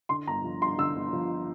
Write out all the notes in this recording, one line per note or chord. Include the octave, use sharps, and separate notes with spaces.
D3 C6
G1 A#5
F3
G2 C6
D3 E6
G1
F3